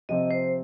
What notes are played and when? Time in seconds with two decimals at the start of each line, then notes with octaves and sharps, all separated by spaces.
0.09 C3 F3 C4 D#5
0.31 C5